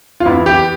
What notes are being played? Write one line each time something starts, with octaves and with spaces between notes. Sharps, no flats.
F4
E2 E4
G4